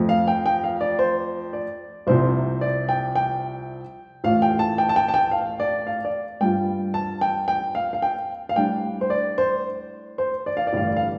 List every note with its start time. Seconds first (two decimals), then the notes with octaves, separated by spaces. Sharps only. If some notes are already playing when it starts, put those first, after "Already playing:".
Already playing: F2 F3 A3
0.09 F5
0.28 G5
0.46 G5
0.64 F5
0.81 D5
0.99 C5
1.53 D5
2.07 C2 C3 F3 C4 C5
2.61 D5
2.89 G5
3.15 G5
4.24 A1 A2 A3 F4 F5
4.42 G5
4.59 A5
4.78 G5
4.89 A5
4.96 G5
5.08 A5
5.14 G5
5.31 F5
5.60 D5
5.87 F5
6.05 D5
6.41 G2 G3 F4 G5
6.94 A5
7.21 G5
7.48 G5
7.75 F5
7.93 F5
8.02 G5
8.49 F5
8.56 A2 G3 D4 G5
9.01 C5
9.10 D5
9.38 C5
10.18 C5
10.46 D5
10.57 F5
10.67 D5
10.73 A1 G2 D3 G3 F5
10.87 D5
10.96 F5